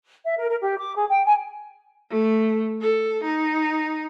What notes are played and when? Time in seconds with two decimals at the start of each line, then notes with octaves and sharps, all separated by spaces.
0.25 E5
0.37 A#4
0.49 A#4
0.61 G4
0.78 D6
0.95 G#4
1.08 G5
1.25 G#5
2.10 A3
2.81 A4
3.24 D#4